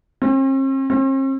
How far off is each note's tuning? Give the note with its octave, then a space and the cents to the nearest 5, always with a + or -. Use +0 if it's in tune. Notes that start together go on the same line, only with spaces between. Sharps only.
C4 +45
C4 +45